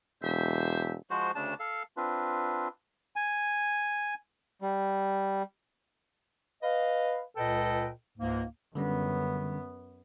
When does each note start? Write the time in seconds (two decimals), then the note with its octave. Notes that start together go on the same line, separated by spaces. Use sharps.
0.23 E1 G4 C5 E5
1.10 F3 G#3 F#4 C5
1.35 D2 C#3 D4 A5
1.60 A4 F5
1.97 C4 D4 F4 B4
3.16 G#5
4.62 G3
6.63 B4 D#5 F5
7.37 C#2 A#2 A4 B4 D#5 G5
8.18 C#2 G#2 A#3
8.75 F#2 D3 G3 B3 C#4